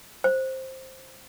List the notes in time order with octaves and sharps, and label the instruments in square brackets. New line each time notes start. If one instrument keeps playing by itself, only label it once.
[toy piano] C5